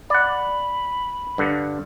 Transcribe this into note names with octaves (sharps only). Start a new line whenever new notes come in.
D5 F#5 B5
G2 D3